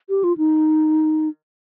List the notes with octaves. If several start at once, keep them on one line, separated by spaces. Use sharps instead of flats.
G4
F4
D#4